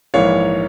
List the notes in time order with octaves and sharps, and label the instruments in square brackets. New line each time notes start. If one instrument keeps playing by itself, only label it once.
[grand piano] A#1 G#2 E3 A#3 C#5 F5